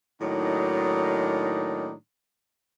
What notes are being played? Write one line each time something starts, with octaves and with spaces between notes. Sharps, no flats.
A2 D#3 F#3 A#3 D4 D#4